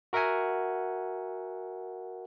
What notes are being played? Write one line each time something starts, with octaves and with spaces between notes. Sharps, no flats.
F#4 A#4 E5 F#5 G#5